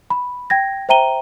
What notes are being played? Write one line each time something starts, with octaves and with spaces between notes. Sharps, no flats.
B5
G5 G#6 A#6
C5 E5 G5 A#5 D#7 G7